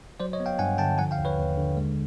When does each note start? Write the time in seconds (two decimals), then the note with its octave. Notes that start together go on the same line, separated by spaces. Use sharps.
0.20 F#3 C5 D5
0.33 C#5 D#5
0.40 B3
0.46 F5 G5
0.59 G2 F#5 G#5
0.78 D3 G5 A5
0.98 F3 F#5 G#5
1.11 F5 G5
1.18 D#2
1.25 B4 C#5
1.38 D#2
1.57 D3
1.77 G#3